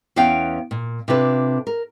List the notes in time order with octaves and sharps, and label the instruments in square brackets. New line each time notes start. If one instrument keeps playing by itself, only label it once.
[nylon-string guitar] E2 B3 C#4 F5 G5
A#2
C3 D4 F4 A4 B4
A#4